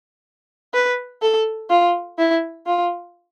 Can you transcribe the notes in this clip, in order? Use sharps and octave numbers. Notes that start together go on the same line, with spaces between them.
B4
A4
F4
E4
F4